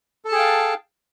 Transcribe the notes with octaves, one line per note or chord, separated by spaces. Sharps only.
G#4 A4 F5 G5 A5